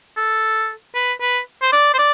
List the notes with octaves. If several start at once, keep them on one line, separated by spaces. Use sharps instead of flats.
A4
B4
B4
C5
D5
C5
D5